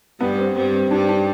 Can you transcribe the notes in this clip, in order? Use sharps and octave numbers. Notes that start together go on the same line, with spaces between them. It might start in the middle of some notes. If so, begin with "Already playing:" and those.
G2 G3 B3
C4
G2 G3 C4
C4
G2 G3 D4
D4